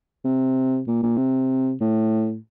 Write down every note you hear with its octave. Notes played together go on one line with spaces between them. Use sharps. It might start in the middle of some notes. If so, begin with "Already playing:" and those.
C3
A#2
A#2
C3
A2